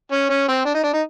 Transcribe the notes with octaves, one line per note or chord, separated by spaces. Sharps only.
C#4
C#4
C4
D4
D#4
D4
D#4